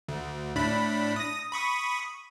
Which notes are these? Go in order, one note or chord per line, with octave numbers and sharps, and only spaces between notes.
D2
A2 D4 B5
D#6 A#6
B5 C#6 D#6